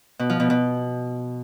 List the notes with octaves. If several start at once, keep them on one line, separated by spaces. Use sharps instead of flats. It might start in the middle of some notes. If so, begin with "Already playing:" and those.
B2
F3
B2
B2